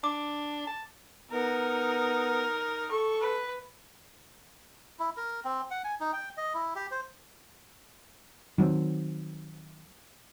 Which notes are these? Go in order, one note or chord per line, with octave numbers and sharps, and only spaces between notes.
D4 D6
A5
B3 D#4 A#4
A4 C#6
B4
E4
A#4
C4
F#5
G#5
D#4
G5
D#5
E4
G4
C5
D#3 F#3 G3 C4